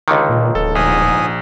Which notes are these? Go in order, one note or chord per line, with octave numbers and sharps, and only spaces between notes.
C#2 D3 D#3
A#2
D1 A4
A#1 G#2 G#5 D#6